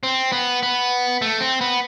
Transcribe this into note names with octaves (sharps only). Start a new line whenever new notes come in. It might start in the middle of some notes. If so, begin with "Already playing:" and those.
C4
B3
B3
A3
C4
B3